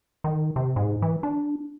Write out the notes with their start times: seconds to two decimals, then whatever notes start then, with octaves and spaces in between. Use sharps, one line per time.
0.24 D#3
0.56 C3
0.76 G#2
1.02 E3
1.23 D4